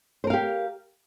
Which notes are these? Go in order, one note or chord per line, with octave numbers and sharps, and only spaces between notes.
G4 A#4 C5 F5